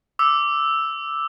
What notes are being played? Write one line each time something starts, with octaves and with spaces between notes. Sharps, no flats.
D6 E6